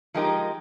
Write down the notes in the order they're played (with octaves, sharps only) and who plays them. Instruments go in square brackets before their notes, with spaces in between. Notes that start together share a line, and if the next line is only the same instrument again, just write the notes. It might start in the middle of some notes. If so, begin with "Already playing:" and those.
[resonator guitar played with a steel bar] F3 G#3 D#4 G4 A#4